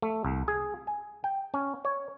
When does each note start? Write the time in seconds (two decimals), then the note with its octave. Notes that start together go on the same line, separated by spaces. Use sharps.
0.02 A3
0.25 C2
0.48 G#4
0.87 G#5
1.24 G5
1.54 C#4
1.85 C#5